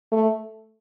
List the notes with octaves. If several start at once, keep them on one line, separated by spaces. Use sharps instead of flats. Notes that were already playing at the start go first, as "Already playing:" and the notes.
A3